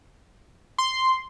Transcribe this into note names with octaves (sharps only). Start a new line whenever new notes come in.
C6